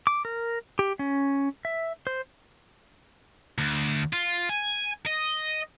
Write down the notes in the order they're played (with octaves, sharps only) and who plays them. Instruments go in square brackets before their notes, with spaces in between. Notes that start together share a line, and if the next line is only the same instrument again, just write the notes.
[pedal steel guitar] D6
A#4
G4
C#4
E5
C5
[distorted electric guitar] D2
F4
G#5
D#5